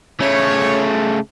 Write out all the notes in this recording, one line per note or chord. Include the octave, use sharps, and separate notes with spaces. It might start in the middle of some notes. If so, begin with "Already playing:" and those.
C#3 A3 C#5